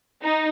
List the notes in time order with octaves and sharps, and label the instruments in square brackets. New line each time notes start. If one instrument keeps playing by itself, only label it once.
[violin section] D#4